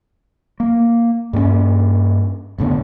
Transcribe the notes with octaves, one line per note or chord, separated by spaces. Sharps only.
A#3
G2 A#3 B3 C#4
F1 A2 D3 B3